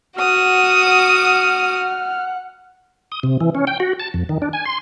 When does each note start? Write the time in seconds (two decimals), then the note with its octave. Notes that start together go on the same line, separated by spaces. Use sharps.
0.18 F#4 F#5 D#6 F6
3.12 D#6
3.23 C3
3.40 E3
3.55 C#4
3.67 G5
3.80 F#4
4.00 A5
4.14 F2
4.29 D#3
4.42 D4
4.53 G#5
4.65 C6